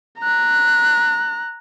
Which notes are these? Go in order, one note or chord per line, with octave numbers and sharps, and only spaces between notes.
A#5 F#6